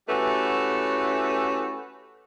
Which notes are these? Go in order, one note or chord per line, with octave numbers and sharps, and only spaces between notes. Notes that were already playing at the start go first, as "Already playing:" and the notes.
A3 C#4 E4 F#4 G4 B4